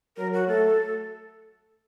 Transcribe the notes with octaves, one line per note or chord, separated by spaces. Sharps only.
F#3 A#4
F#4
A3 A4